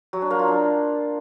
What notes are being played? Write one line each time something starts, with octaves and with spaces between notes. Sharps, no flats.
F#3
D4
A#3
F4
D4